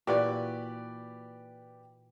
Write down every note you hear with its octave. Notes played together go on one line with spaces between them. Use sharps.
A#2 E3 F#4 G4 B4 D5